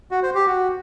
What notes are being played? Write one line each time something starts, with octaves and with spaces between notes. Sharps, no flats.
F#4
C5
G4
F#4